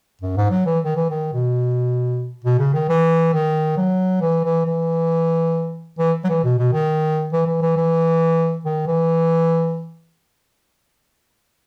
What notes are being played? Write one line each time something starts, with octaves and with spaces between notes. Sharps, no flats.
F#2
G#2
F#3
E3
D#3
E3
D#3
B2
B2
C#3
D#3
E3
D#3
F#3
E3
E3
E3
E3
F#3
E3
B2
B2
D#3
E3
E3
E3
E3
D#3
E3